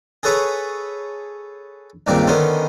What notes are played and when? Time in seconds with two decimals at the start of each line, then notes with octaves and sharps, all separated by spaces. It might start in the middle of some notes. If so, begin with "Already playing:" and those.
0.23 G#4 A4 B4 C#5 A#5 B5
2.07 C#2 G2 A#2 D#3 C4 D6
2.27 D3 D#3 B3 C#4 C5